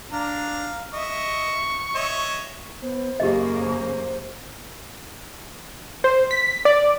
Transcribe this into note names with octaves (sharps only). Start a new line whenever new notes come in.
D4 F5 A#5
D#5 E5 C#6
C#5 D#5 E5
B3 C5
F#2 C#3 A#3 G4 G#4 D#5
C5
C5
B6
D5